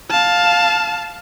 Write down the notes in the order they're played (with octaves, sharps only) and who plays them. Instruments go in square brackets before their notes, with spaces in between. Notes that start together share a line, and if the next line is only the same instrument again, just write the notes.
[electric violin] F5 A5